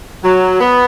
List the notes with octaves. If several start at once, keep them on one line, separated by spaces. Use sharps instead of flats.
F#3
B3